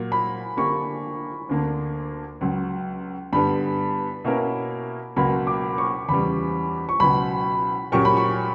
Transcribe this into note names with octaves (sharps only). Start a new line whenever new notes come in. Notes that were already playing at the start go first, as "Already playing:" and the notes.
Already playing: A#2 F#3 A#3
B5
D3 A#3 D4 G4 C#6
D2 D3 A#3
C#2 C#3 F#3
G2 D3 G3 B3 B5
B2 A#3 C#4 E4 A#4
C#2 B2 F#3 A#3 B5
D6
C#6
E2 C#3 G3 B5
C#6
C#2 B2 F#3 B5
A#2 F#3 C#4 G4 A#4 C#6
B5
C#6